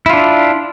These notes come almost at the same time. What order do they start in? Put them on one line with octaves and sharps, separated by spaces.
E4 F4 D4